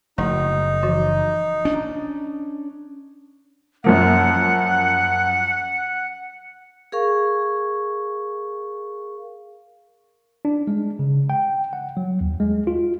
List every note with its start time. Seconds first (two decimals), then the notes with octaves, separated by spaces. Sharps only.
0.18 F#1 F3 A3 D#4
0.82 E3 F3 F#4
1.65 C#4 D4
3.84 F#2 F3 A#3 F#5
6.92 G#4 A#4 F5 C#6
10.45 D4
10.67 G#3
10.99 C#3
11.30 G5
11.73 F#5
11.97 F#3
12.21 D#2
12.40 G#3
12.67 F4